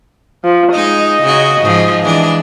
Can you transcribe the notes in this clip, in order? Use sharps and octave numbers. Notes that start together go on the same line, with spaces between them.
F3
G#3 D#4 D#5
C#3 F#4
G#2 F3
E3 G#3 D4